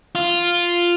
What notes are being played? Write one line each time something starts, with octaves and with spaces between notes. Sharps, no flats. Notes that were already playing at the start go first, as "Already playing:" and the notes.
F4